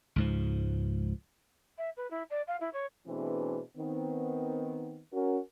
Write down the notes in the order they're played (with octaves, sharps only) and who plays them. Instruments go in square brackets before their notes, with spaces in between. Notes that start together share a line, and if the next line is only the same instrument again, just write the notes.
[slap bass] C#2 G#2 F3
[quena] E5
B4
E4
D5
F5
E4
C#5
[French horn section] B2 E3 A3 C4 D4 G#4
D#3 B3 C4
C#4 F#4 A#4